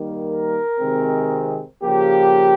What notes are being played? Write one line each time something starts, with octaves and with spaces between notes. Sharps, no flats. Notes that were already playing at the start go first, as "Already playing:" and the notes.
Already playing: D#3 G3 A#3
A#4
C3 D#3 G#3 C4
C#3 F3 A#3 G4